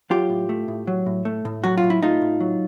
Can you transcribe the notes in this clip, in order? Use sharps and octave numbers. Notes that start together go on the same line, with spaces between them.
F#3 F4 G4
A2
A3
A2
F#3
A2
A3
A2
F#3 F#4
F4
A2
E4
A3 D#4 F4
A2
F#3